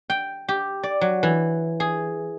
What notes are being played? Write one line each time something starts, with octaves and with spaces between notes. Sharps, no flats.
G5
G4
D5
F#3
E3
G#4